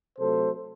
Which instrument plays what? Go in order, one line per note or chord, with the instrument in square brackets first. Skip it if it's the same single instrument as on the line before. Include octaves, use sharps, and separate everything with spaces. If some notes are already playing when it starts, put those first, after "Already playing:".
[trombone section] C3 F#3 A3 A4 C5